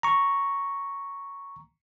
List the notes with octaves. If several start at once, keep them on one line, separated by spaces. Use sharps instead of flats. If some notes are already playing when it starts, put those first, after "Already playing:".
A#5 C#6